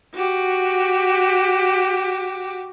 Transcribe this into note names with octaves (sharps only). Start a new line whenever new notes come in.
F#4 G4